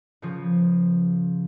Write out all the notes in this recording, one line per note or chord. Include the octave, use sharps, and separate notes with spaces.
C#3 F3